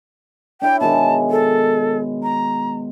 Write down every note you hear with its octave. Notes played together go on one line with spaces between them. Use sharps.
D4 E4 C#5 G5
B2 D#3 G#3 A5
A4
A#5